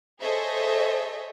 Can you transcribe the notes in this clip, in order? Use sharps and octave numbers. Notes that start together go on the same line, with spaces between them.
G#4 A4 C5 C#5 D#5 E5